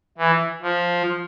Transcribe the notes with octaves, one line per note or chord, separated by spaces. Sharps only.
E3
F3